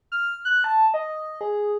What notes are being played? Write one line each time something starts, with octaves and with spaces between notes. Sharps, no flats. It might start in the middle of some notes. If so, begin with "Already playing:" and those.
F6
F#6
A5
D#5
G#4